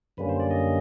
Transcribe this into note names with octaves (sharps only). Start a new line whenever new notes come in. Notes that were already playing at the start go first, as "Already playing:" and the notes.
F#2 D3 G3 A#3 C#4 B4
C5
D5
D#5